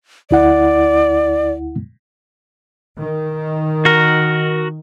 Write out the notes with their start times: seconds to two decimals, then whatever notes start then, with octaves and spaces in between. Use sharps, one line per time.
0.31 D2 E4 D5 F#5
2.99 D#3
3.85 F#4 A#4